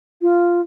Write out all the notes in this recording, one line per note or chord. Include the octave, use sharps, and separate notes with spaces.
F4